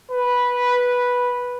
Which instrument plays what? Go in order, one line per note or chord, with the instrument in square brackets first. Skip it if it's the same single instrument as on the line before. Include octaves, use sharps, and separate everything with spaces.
[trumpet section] B4